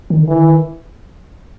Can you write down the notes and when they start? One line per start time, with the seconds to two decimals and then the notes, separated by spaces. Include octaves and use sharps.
0.10 D#3
0.23 D3
0.28 E3
0.36 D#3